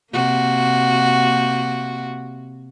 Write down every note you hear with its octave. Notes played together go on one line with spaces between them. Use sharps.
C3 A#3 F#4